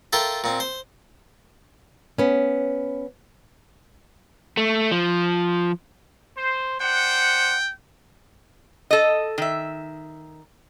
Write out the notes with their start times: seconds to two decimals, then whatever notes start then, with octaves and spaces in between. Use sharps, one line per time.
0.13 F4 A4 A#4 E5 G5
0.44 A#2 C4
0.60 C5
2.18 B3 C#4
4.57 A3
4.92 F3
6.37 C5
6.81 D4 C5 F#5 G5
8.91 A4 D#5
9.38 D#3 E5